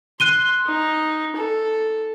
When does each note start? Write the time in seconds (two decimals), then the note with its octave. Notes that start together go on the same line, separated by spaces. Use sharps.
0.20 C6 F#6 D#7 G7
0.66 D#4
1.36 A4